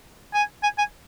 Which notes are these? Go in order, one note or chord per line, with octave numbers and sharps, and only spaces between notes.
G#5
G#5
G#5